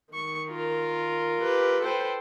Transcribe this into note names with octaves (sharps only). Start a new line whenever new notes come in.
D#3 C#6
F4 A#4
G4 B4
A4 B4 C5 G5